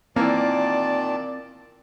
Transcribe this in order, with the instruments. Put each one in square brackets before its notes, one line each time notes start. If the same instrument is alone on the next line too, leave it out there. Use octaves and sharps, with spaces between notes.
[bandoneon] A#2 D#3 A5 [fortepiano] E3 A#3 [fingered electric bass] C4 [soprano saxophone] D5